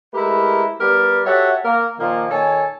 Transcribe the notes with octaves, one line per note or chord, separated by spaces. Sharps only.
G#3 A3 E4 G4 A#4 B4
G3 B3 G4 A#4 B4 D5
F#4 G4 A4 C#5 E5 F#5
A#3 A#4
A#2 D#3 F3 A#3
A#2 D#3 A4 C#5 G#5